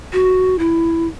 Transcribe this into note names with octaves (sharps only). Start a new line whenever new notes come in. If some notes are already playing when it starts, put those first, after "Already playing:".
F#4
E4